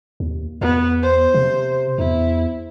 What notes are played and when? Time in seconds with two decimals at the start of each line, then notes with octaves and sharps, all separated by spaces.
0.20 D#2
0.61 E2 B3
1.02 C5
1.34 C3
1.98 E2 E4